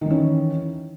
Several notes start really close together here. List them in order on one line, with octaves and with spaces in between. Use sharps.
D#3 E3 C#4